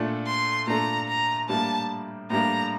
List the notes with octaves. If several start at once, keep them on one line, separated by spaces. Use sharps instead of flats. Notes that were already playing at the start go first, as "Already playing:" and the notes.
Already playing: A#2 A3 D4 A4
C6
A#2 A3 D4 A4 A#5
A#5
A2 G3 A#3 D4 A5
A2 G3 A#3 D4 A#5